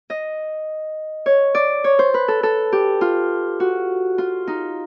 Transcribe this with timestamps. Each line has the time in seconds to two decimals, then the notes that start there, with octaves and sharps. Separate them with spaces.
0.10 D#5
1.26 C#5
1.55 D5
1.84 C#5
1.99 C5
2.14 B4
2.28 A4
2.43 A4
2.72 G4
3.01 F4
3.60 F#4
4.18 F4
4.47 D#4